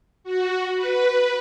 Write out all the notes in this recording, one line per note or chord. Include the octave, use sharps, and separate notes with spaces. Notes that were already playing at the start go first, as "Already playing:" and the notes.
F#4
B4